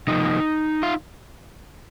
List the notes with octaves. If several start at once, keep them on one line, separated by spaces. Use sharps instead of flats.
C3 F3 A#3 D#4
F4